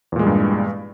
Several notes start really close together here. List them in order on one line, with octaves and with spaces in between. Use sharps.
E2 A#2 G#3 G3 G2